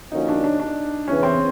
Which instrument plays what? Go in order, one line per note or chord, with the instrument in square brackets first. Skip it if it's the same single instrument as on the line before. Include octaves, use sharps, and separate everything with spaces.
[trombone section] D3 F3 A#3 C#4 F#4 [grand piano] D#4
[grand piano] D4
D4
D4
[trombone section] E2 C#3 E3 [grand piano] C#4
[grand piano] C4